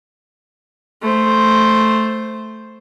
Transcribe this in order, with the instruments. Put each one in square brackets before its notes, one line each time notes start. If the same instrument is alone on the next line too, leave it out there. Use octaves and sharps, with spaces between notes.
[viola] A3 C5